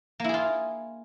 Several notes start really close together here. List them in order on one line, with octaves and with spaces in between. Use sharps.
A#3 E4 G#4 F4